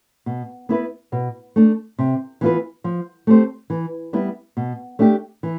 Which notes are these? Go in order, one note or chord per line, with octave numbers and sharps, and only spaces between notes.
B2
B3 E4 B4
B2
A3 D4
C3
E3 B3 F4 B4
F3
A3 C4 G4 C5
E3
G3 B3 E4
B2
A3 D4 G4
E3